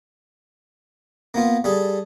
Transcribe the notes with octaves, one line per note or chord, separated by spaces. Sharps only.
A#3 B3 F4
G3 G#4 A4